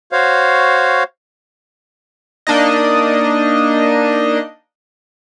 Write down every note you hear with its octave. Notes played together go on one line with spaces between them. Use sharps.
F#4 C5 C#5 F5
A#3 D4 D#4 D#5